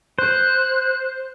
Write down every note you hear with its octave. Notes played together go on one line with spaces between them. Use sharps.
C5 F#6